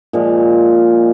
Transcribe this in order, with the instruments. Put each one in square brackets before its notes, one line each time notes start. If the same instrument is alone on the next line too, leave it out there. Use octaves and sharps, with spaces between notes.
[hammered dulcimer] A#2 F3 G#3